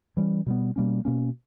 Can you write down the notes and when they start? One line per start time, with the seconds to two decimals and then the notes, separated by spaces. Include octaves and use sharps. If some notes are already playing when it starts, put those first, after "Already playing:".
0.17 E3 G3 C#4
0.46 B2 G3 B3
0.76 B2 G3 A#3 C#4
1.05 B2 A#3 C#4